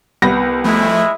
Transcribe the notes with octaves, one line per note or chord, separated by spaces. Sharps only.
C2 B3 B4 A#6
E3 F3 G#3 A3 E4